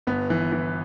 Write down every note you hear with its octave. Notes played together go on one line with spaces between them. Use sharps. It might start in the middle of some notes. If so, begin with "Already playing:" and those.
G1 B3
E3
E3